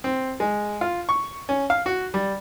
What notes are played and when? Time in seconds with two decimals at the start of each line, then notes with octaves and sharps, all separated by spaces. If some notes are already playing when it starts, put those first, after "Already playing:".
0.04 C4
0.40 G#3
0.81 F4
1.09 C#6
1.49 C#4
1.70 F5
1.86 F#4
2.14 G3